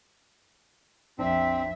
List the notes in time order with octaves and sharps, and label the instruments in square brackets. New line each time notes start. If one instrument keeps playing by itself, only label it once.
[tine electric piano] A#1 D4 [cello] F2 E5 [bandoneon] C4